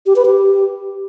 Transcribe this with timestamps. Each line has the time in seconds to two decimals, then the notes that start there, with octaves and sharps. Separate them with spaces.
0.06 G4
0.16 B4
0.26 G4